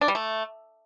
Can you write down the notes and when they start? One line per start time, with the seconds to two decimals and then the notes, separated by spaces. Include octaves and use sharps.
0.01 D4
0.08 G3
0.15 A3